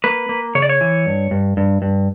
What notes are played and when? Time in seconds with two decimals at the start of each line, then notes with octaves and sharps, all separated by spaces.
0.04 A#3 B4
0.29 A#3
0.55 C#3 C#5
0.62 D5
0.69 C#5
0.81 E3
1.06 G2
1.31 G2
1.57 G2
1.82 G2